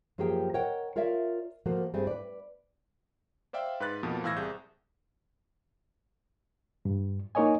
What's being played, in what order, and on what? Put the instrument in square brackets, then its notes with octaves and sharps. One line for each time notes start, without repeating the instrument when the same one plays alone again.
[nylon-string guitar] F#2 F3 A#3 G4 G#4 G5
A#4 C#5 D#5 F#5 G5
F4 A#4 C#5 D5 E5 F5
F3 A3 A#3 F#4
G2 G3 A3 C4 G#4
B4 D5
[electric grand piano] C5 D5 E5 F5 G5
G#2 B4 B5 F#6 A6
F2 B2 F3 A#3
A2 E3 F5 E6 G#6 A#6
C2 C3 G#4 G6
[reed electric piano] G2
A#3 D#4 A#4 C#5 D#5 G#5